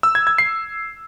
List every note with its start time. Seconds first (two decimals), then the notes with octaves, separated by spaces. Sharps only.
0.03 E6
0.15 G#6
0.27 G#6
0.38 C7